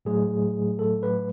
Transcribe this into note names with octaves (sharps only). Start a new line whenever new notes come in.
A2 F#3 A3 G#4
A4
B4